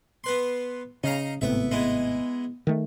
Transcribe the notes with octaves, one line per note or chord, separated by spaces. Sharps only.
B3 B4 C6
C#3 D#4 F5 A#5
G#1 A2 C3 B3 E5
G#3 B3 E4
D#3 A3